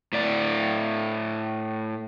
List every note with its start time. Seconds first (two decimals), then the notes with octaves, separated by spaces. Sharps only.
0.13 A2 D5